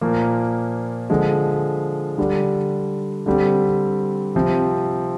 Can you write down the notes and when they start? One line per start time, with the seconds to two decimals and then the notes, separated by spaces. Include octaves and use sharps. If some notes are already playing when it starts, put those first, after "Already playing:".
0.01 A#2 F3 A#3
1.10 D3 F3 G#3
2.18 D3 G3 D4
3.26 D3 G3 C4
4.35 C3 F3 C4